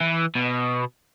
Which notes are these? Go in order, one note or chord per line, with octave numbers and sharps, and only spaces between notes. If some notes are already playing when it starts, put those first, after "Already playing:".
E3
B2